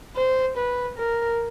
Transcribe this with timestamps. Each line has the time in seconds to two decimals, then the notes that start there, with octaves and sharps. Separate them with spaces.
0.16 C5
0.57 B4
0.98 A#4